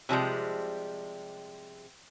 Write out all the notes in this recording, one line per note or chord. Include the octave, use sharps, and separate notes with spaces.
C3 F3 G3 G#3